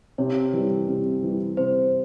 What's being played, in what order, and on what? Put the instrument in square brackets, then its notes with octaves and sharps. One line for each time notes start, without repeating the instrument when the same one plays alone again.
[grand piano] C3 [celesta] C#5
[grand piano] E3 G3
C3
E3 G3
[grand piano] C3 [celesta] C5